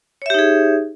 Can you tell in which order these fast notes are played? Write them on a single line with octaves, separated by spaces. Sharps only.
C#5 E5 G4 D#4 G#4